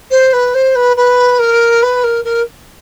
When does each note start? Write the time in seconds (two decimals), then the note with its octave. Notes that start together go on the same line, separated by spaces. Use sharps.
0.10 C5
0.33 B4
0.54 C5
0.75 B4
0.96 B4
1.39 A#4
1.82 B4
2.03 A#4
2.24 A#4